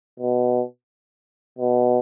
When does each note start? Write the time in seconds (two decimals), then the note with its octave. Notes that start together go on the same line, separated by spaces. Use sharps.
0.19 B2
1.58 B2